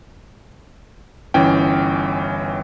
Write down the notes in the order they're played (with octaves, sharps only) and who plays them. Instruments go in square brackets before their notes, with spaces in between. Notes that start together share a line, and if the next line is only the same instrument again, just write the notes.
[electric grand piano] G1 E3 C#4 G5